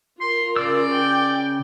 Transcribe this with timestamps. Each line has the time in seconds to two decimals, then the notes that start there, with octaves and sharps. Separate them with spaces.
0.21 F4 A#4 C6
0.56 C#3 D5 E6
0.93 G5